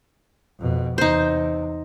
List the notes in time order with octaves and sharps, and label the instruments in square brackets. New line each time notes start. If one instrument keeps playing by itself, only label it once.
[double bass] F2 B2
[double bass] E2 C3 [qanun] D#4 C5